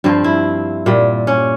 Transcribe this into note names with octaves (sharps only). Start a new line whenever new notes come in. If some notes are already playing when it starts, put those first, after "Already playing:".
G2 F3 C4
E4
A#2 G3
C#4